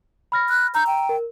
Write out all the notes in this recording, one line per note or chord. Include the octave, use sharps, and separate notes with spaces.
B5 F6 A#6
F#6
A#5 E6 G6
G5
A#4